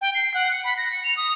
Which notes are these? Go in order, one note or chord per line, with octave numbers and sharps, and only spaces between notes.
G5
C7
F#5
C#7
B5
A#6
C#7
F7
D#6